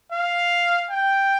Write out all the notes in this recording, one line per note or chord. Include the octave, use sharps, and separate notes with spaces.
F5
G5